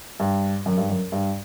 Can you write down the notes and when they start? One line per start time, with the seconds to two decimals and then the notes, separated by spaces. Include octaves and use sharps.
0.20 G2
0.66 F#2
0.77 G2
0.89 F#2
1.12 G2